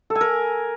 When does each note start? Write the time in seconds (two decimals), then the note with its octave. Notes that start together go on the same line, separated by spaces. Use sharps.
0.10 A4
0.15 G#5
0.21 A#4